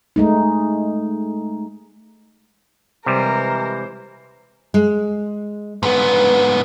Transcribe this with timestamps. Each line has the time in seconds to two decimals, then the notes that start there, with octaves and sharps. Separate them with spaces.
0.16 G#3 A3 D#4
3.06 C3 E3 G3 G#3 A#4 C5
4.74 G#3
5.83 G#2 B3 B4